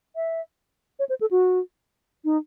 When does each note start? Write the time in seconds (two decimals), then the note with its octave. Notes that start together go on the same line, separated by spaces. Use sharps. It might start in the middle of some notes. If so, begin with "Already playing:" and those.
0.16 E5
0.99 C#5
1.09 C5
1.21 A4
1.31 F#4
2.25 D#4